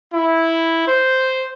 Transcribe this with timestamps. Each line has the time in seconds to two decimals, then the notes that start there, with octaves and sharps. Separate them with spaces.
0.12 E4
0.87 C5